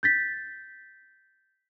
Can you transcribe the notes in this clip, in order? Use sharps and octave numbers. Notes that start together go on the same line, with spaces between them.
G6 A6 B6